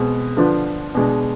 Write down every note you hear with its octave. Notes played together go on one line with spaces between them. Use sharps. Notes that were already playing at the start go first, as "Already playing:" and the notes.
Already playing: B2 G#3 C4
D3 F3 B3 D4 F4
B2 G#3 D4